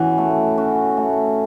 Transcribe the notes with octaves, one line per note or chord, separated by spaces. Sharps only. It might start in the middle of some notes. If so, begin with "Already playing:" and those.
Already playing: E3 C#4 F#4
A3
C#4 F#4
A3